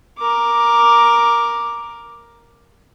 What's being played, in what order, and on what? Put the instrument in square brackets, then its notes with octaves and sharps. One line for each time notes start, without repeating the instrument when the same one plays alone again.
[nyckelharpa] A#4 D6